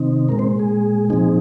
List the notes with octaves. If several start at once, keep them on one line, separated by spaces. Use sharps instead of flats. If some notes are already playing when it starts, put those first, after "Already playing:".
Already playing: C3 D#3 C4 D#4
A#2 G#3 C4 A#4
C4 C5
G#4
A#2 F3 C4 D#4 G#4